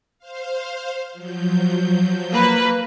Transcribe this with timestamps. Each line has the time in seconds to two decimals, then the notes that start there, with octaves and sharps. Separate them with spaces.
0.19 C5 F5
1.13 F3 F#3 G6
2.32 A#3 B4